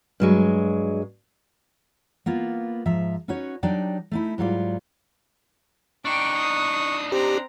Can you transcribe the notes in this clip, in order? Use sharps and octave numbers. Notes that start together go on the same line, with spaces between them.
G2 F#3 G#3
A#3 B3 F4
G#2 F3 E5 A#5
C#4 D#4 F#4 B4 C#5
F#3 D4 D#4 G4 D5 G5
A3 D#4 E4
G#2 F#3 G3 F4 D5
D4 D#4 G5 C#6 D6
D#6
C4 G4 A#5